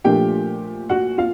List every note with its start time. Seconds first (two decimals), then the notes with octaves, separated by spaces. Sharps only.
0.04 A#2 F3 A3 D4 G4 G5
0.89 F#4 F#5
1.18 F4 F5